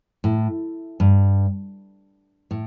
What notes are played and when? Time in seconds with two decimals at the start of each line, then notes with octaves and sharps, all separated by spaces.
0.24 A2
1.00 G2
2.51 A2